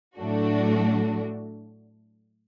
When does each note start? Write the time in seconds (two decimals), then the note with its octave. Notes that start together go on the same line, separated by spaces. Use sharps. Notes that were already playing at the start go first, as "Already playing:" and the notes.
0.17 A2 F#3 A3 D4 F#4